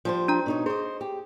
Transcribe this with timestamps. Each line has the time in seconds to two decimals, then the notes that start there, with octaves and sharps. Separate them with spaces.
0.05 F3 G3 C5
0.28 D4 A#5
0.46 B2 D#4 C#5
0.66 G#4 C5 D#5
1.01 G4